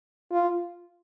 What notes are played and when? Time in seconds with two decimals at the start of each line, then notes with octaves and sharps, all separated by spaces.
0.32 F4